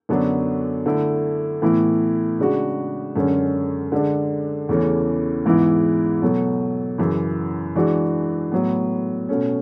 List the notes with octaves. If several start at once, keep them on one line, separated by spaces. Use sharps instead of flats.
F#2 D3 F#3 B3 D4
D3 A3 E4
A2 E3 B3 E4
C#3 G#3 D4 F#4
F#2 D3 G#3 C#4
D3 G#3 D4
E2 C#3 E3 A3 C#4
G#2 E3 B3 E4
B2 F#3 A3
F#2 C#3 E3
E3 G#3 D4 F#4
A2 F#3 B3
B2 A3 C#4